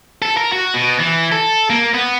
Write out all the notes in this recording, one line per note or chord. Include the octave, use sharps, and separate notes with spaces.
A4
A#4
F#4
B2
E3
A4
A#3
B3